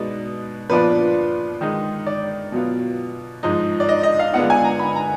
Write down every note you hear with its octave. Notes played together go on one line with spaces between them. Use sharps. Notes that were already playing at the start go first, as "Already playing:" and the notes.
Already playing: B2 G#3 B3 D#4 D5
A#2 F3 B3 D4 F4 B4
D#3 G#3 D#4
D5
B2 F#3 B3 F4
G#2 F3 G#3 D#4
D5
D#5
D#5
F5
D3 G#3 B3 F4 F#5
G#5
A#5
B5
A#5